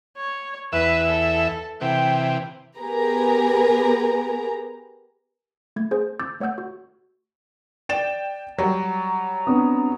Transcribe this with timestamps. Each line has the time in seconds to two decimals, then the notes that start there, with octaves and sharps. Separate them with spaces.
0.17 C#5
0.73 E2 B4 E5
1.09 A4
1.81 C3 E3 G5
2.78 B3 G4 G#4 A#4 B4 A#5
5.76 A3 G#6
5.91 G#4 C5
6.20 D6 E6 G6 A6
6.40 A3 C#5 F#5 E6 G6
6.58 F#4
7.89 D5 G5 A6 E7
8.58 F#3 G3 A#5
9.47 B3 C4 D4 D#6